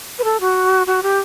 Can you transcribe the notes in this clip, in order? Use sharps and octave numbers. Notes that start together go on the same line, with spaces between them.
B4
A4
F#4
F#4
G4